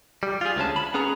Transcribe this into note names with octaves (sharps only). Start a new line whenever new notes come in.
G3
F4 G#4
D2 G#3 C#4 A5
B5
B3 C#4 G#4 A#5